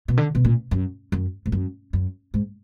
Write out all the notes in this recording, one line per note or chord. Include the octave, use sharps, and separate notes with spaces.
B2
D3
B2
A#2
F#2
F#2
G#2
F#2
F#2
G#2